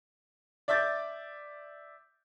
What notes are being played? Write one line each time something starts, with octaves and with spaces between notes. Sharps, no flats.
D5 E5 D6 G6 A6